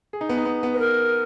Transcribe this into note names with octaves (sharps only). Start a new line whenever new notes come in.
G#4
D#4
B3
D#4
B3
B3
B4
A#4